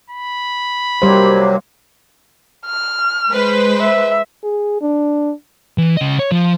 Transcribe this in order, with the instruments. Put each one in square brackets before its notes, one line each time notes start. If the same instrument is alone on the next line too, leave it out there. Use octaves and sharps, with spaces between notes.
[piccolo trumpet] B5
[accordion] C3 F#3 A#3 [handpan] G3 C5
[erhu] F6
[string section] G#3 B4 C5
[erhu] E5
[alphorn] G#4
D4
[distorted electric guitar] E3
C#3 D#5
C#5
F3